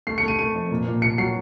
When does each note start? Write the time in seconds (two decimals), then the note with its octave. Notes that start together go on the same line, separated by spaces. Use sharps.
0.07 A3 C7
0.18 C#7
0.23 A3 D#7
0.39 A3 D#7
0.55 F2
0.71 A#2
0.86 A#2
1.02 A#2 C#7
1.18 F#3 C7